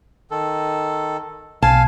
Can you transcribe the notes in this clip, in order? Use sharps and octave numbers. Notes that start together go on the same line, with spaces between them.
D#3 A4
B1 F5 G#5 A5